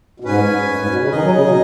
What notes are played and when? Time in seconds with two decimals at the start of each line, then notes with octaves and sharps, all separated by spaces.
0.20 B2
0.24 G#2 C#4 B4 G#5
0.68 F#2
0.79 G#2
0.90 B2
1.01 C#3
1.12 D#3 D#4 G#4 D#5
1.23 F#3
1.34 C#3
1.45 B2